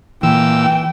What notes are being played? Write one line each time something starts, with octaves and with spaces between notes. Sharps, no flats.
A#2 E3 G5 E6